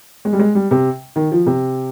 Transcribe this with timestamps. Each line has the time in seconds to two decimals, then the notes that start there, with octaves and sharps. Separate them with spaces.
0.25 G#3
0.33 G3
0.39 G#3
0.55 G3
0.71 C3
1.16 D#3
1.32 F3
1.46 C3